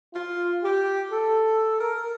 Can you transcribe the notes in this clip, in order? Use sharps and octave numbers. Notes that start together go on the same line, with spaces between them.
F4
G4
A4
A#4